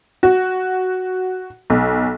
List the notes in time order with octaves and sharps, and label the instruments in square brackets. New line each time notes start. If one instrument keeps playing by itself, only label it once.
[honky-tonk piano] F#4
B1